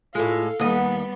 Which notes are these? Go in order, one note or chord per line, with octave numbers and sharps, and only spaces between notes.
A2 G#3 F4 A4 F5
D#2 G3 B3 D#5 F#5